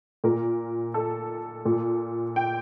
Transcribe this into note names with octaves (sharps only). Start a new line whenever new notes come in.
A#2 A#4
A4
A#2
G5